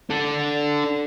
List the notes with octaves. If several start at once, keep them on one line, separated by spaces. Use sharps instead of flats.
D4 A4